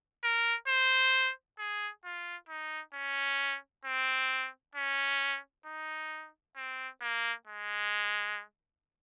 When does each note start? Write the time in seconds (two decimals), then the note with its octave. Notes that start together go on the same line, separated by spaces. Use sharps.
0.24 A#4
0.68 C5
1.59 G#4
2.04 F4
2.49 D#4
2.94 C#4
3.85 C4
4.75 C#4
5.66 D#4
6.57 C4
7.01 A#3
7.47 G#3